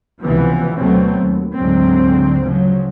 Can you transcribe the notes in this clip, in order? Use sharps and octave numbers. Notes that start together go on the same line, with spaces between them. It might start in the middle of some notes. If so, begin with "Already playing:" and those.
C#2 C3 E3 F3 B3
D2 B2 F#3 A3 B3 C4
D#2
D2 G#2 D3 F#3 C4
C#3 F3 F#3